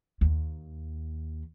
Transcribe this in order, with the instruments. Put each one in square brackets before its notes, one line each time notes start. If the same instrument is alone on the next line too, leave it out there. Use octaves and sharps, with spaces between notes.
[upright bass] D#2